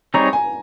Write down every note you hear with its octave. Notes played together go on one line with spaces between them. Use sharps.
G3 C4 D#4 G#4 C#5 A#5
G#5